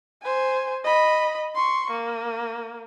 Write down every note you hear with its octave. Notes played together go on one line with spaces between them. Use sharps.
C5 G#5
D#5 B5
C6 C#6
A#3